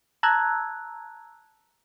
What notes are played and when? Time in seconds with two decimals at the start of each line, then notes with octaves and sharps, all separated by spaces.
0.23 A5 A#5 E6 F#6 G#6